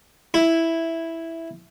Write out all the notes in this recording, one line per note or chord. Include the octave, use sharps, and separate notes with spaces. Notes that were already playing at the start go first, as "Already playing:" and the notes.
E4